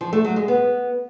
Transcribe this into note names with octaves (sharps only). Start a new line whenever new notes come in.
F3
A3
F#3
G#3
B3